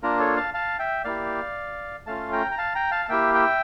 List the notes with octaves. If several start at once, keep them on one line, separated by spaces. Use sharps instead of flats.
A#3 D4 F4 A#4
A4 C#5
F5 A5
F5 A5
E5 G5
A#3 E4 G4 D5 F5
A3 C#4 F4 F5 A5
G5 A#5
A#5
F5 A5
G5 A#5
F5 A5
A5
A#3 E4 G4 E5 G5
E5 G5